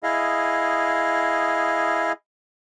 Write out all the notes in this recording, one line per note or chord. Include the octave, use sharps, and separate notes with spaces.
E4 G#4 D#5 F5